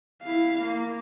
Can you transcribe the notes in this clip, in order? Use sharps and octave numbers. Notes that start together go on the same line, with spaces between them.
E4 F5
A#3